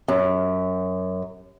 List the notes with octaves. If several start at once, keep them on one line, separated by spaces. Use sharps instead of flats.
F#2